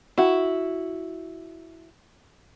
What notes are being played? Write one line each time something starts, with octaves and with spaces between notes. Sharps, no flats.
E4 F#4